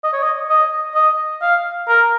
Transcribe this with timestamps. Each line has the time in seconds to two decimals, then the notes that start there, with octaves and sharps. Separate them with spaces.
0.04 D#5
0.13 C#5
0.23 D#5
0.50 D#5
0.95 D#5
1.42 F5
1.88 A#4